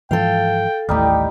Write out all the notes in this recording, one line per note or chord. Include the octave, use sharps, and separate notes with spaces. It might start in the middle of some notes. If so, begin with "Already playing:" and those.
G#2 E3 F3 A4 F5 G5
A1 D#2 G3 A3 D#4 G4